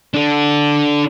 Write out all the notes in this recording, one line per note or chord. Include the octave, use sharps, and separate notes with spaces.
D4 A4